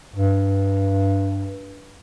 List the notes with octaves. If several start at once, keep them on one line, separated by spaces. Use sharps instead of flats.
G2